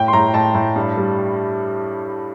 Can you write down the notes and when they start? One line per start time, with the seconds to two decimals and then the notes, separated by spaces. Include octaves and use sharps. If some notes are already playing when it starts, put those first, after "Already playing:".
Already playing: A2 G5
0.08 C6
0.13 A2 A#5
0.34 A2 A5
0.55 A2
0.75 G2
0.97 G3